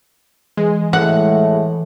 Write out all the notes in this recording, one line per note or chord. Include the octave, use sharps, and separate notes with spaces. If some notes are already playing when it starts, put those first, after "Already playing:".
E3 G#3
A2 F#5